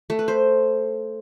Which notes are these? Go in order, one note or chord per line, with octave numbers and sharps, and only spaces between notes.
A3
B4
C5